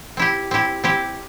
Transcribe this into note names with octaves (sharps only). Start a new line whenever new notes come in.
C4 E4 G4
C4 E4 G4
C4 E4 G4